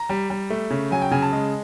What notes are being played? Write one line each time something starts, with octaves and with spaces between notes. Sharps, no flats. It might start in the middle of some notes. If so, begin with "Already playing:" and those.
Already playing: A#5
G3
G3
A3
C#3
F#3 G#5
G5
C#3 G#5
A5
G#3